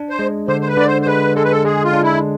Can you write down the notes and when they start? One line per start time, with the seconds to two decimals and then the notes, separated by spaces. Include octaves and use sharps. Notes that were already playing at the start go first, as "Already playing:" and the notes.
Already playing: D4
0.10 C5
0.19 G#3
0.48 D3 C5
0.61 C5
0.67 B4
0.77 D3 D5
0.87 C5
1.02 C5
1.07 G#3 B4
1.35 G#3 A4
1.44 B4
1.51 A4
1.65 G#3 G#4
1.84 F4
1.93 D4
2.03 E4